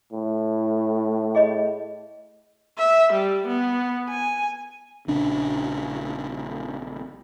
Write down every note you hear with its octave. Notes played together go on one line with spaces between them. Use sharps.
A2
G#4 D#5 B5
E5
G3
B3
G#5
A#1 C#3 D4